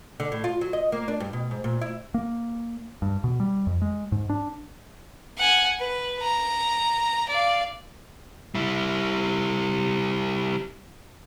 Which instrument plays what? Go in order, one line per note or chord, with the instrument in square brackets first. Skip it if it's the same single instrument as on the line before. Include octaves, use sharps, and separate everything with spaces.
[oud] D3
A2
F4
F#3
D#5
A#3
D4
G2
B2
G#2
A#2
E4
[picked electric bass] A#3
G2
B2
G3
F2
G#3
G#2
D4
[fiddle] F#5 G#5
B4
A#5
D5 F5
[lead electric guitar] G3 E4